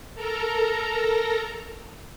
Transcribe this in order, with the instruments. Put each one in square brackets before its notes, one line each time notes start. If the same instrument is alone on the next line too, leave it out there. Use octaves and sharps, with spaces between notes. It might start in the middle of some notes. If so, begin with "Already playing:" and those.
[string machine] A4 A#4 A#5